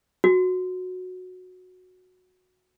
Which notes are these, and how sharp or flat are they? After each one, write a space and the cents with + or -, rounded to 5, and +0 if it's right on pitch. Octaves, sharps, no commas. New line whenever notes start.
F#4 -10